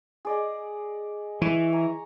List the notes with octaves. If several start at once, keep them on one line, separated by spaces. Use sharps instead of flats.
G#4 D5 D#5
E3 C#6
G#5 A#5